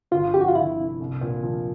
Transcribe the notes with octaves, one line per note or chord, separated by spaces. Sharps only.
G1 F4
F2 G4
F#4
F4
G1 E4
C3
C2
A#2
F3